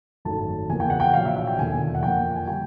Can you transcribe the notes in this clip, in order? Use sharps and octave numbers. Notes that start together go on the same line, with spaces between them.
G#1 F#2 D#3 F#3 A3 A5
E2 C#3 F3 A#3 G#5
G5
F#5
G5
A#1 A#2 F#3 F5
E5
E5
G5
E1 D#2 D3 F3 A#3 G#5
F#5
F2 D3 F3 A#3 G5
G#5
D3 G3 G5